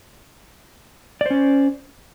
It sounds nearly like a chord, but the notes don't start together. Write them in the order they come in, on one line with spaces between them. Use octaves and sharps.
D5 C5 C#4